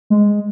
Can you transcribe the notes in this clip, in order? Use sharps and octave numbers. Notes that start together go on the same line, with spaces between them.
G#3